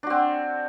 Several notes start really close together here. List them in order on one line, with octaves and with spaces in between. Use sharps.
D4 F#4 C4